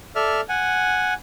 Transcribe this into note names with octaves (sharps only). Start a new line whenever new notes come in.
A4 D5 E5 F6
F#5 G#5